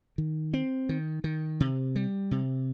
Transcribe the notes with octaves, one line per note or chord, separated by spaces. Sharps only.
D#3
C4
D#3
D#3
C3
G3
C3